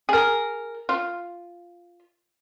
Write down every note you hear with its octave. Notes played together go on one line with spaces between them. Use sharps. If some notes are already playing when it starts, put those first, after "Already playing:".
G#4 A#4
F4